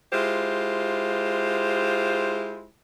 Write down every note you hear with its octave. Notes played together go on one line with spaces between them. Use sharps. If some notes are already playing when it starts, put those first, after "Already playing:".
G#3 E4 F4 G4 C5